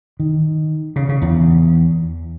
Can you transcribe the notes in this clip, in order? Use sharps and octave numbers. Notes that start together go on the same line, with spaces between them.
D#3
C#3
C#3
E2